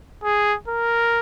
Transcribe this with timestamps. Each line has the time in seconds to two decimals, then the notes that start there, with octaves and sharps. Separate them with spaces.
0.24 G#4
0.68 A#4